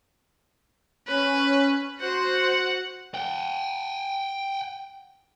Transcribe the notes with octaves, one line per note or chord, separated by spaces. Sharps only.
C#4 B4
F#4 C5 F#5
F#5 G5